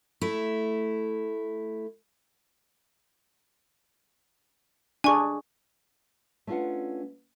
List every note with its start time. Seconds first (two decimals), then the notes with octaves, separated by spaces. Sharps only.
0.21 A3 E4
5.04 D4 G#4 G#5 C#6
6.47 A3 C#4 D4 F4 B4 F#5